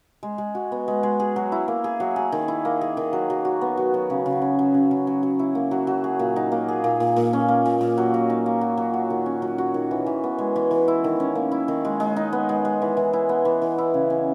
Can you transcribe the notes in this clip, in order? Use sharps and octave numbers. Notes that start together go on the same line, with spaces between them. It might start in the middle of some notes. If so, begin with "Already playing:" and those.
G#3
G#3
F#4
B3
G#3
G#3
G#4
F#3
E4
A#3
G#4
F#3
G#4
D#3
E4
A#3
G#4
D#3
F#3
F#3
F#4
B3
F#3
F#3
C#3
C#3
C#4
F#3
C#3
C#3
F#3
F#3
E4
A#3
F#3
F#3
G#4
A#2
D#4
A#3
G#4
A#2
A#2
A#2
C#4
A#3
A#2
A#2
F#3
F#3
D#4
A#3
F#3
F#3
F#4
D#3
C#4
F#3
F#4
D#3
E3
E3
B3
G#3
E3
E3
E4
D#3
C#4
A#3
E4
D#3
G#3
G#3
D#4
B3
G#3
G#3
E3
E3
E4
B3
E3
E3
E4
C#3
C#4